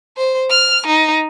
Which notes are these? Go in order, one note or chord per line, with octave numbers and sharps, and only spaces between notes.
C5
F6
D#4